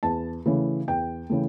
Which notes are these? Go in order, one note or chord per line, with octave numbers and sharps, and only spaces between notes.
E2 A5
C#3 E3 A3
E2 G5
C#3 E3 A3